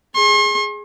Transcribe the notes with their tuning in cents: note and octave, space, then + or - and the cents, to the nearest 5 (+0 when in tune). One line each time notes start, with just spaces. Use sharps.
G#4 +0 C6 +45